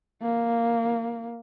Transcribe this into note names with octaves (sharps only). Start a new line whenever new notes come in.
A#3